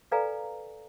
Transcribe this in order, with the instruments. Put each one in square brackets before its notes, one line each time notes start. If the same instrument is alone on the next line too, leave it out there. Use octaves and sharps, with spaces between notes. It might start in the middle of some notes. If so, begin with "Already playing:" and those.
[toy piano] A4 B4 D5 F5 G#5 A#5